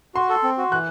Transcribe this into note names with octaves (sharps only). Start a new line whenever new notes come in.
F#4 C6
A4
C4
F#4
E3 F#6